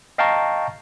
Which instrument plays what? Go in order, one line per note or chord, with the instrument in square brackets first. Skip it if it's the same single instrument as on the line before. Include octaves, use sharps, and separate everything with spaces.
[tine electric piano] D#5 F5 G5 A5 A#5 C#6